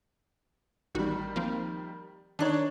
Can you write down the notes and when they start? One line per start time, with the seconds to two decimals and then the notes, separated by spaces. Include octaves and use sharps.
0.95 A1 D#3 G3 F#4
1.36 F3 A#3 C4
2.39 D#3 D4 D#4 C#5 F#6